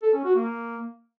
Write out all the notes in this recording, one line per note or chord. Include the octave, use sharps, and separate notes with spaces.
A4
C#4
F#4
A#3